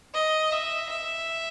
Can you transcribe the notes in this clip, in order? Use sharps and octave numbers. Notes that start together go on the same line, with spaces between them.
D#5
E5
E5